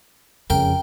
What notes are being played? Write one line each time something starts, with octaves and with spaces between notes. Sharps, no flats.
F2 C#3 A#4 G5